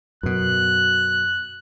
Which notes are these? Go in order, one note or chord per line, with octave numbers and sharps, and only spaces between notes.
F#2 B2 F#6